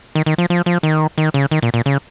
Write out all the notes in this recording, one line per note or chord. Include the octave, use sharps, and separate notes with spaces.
D#3
D#3
F3
F3
F3
D#3
D#3
C#3
D#3
A#2
A#2
C#3